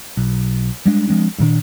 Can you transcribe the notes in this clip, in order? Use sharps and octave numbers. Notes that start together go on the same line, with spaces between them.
B1
G3 G#3 D4
F3 G#3 C4 D4
G2 A#2 D#3 D4